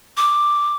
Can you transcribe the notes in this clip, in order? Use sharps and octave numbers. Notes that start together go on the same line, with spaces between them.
D6